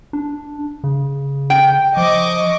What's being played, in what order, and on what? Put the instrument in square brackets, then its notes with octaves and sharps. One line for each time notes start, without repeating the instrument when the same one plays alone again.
[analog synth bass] D4
C#3
[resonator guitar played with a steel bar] G5
[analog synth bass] F3 [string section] D#5 C#6 D6